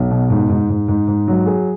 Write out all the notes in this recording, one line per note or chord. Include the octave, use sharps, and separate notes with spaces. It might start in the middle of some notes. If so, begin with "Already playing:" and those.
Already playing: B1
B2
G#2
G#2
G#2
G#2
G#2
F#3
G#4